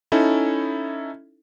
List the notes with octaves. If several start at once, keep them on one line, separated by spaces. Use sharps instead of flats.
C#4 D#4 E4 A4